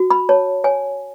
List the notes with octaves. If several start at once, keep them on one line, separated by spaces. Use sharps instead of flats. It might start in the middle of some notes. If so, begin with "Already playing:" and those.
Already playing: F#4
B5
C#5 A5
C#5 G#5